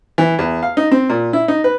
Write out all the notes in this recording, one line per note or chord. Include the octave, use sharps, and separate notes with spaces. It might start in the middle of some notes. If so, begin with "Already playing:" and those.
E3
E2
F5
D#4
C4
A#2
E4
D#4
B4